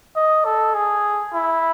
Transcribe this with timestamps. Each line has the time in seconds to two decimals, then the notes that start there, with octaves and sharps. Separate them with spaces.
0.16 D#5
0.45 A4
0.74 G#4
1.34 E4